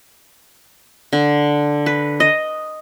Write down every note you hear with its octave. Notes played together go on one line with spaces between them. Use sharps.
D3
B4
D#5